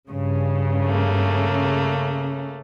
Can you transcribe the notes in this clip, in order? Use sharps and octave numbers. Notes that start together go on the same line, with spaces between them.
G2 C#3
A3 A#3